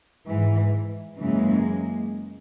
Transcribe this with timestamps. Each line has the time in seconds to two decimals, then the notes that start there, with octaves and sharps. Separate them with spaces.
0.27 G#2 E3
1.19 F#2 C#3 E3 G#3 A#3